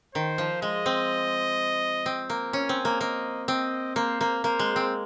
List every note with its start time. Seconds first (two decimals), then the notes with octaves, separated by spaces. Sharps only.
0.15 D#3 C5
0.38 F3
0.62 G#3 D#5
0.86 C4
2.06 C4
2.30 A#3
2.53 C#4 G#5
2.69 C4
2.85 A#3
3.01 A#3 D#5
3.48 C4 D#5
3.96 A#3 C5
4.21 A#3
4.44 A#3 C5
4.59 G#3
4.76 C4